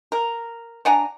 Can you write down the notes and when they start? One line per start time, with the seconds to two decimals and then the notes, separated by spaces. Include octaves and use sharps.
0.12 A#4
0.85 D4 F#5 G#5 A#5